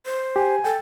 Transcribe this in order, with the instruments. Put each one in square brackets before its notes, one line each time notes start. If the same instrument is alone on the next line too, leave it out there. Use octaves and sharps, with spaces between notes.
[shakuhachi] C5
[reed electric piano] G4 [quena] G#5
[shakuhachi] A4 [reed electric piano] G5